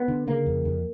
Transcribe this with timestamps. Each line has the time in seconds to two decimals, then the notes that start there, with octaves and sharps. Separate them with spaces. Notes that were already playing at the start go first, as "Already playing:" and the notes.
Already playing: B3
0.08 D3
0.27 C#3 A#3
0.46 F2
0.65 F2